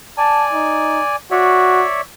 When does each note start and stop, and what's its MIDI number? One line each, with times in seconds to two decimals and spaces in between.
0.18 1.16 74
0.18 1.16 80
0.18 0.44 81
0.53 1.00 63
1.31 1.85 66
1.31 2.01 73
1.31 2.01 74
1.31 2.01 76